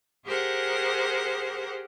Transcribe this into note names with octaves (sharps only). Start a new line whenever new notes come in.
G4 G#4 A#4 C5 F#5